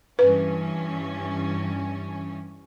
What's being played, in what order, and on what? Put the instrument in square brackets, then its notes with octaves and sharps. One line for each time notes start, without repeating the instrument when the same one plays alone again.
[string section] G2 E3 C#4 [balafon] B4